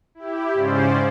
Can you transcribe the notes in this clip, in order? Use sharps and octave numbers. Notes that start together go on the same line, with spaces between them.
E4 G4
G#2 C#3 C#4 C5 D5